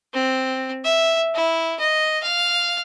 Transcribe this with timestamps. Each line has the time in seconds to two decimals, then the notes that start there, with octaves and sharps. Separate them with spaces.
0.14 C4
0.84 E5
1.35 E4
1.79 D#5
2.23 F5